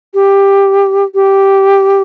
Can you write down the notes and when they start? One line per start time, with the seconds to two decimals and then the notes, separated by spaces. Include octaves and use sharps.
0.14 G4
1.14 G4